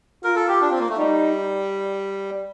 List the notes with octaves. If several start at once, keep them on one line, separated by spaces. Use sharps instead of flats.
F4 A#4
A4
G4
D4
C4
A#3
A3
G3 D#4